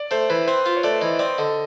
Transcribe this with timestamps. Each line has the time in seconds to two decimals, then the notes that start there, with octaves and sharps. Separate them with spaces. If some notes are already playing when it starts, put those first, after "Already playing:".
Already playing: D5
0.11 A3 C5
0.30 E3 B4
0.48 C4 C5
0.66 F4
0.77 C#5
0.84 A3 D5
1.01 E3 D#5
1.19 C4 D5
1.38 D3 D#5